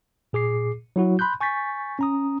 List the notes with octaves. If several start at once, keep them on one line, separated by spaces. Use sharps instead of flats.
A#2 G#4 D6 C7
F#3 E4 F#4
B5 C6 F#6 G6
G#5 C#6 G6 A6 B6
C#4 A#5 D#6